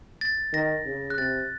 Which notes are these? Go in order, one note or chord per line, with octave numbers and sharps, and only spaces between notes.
A6
D#3 A#6
C#3
F#6
C3 A6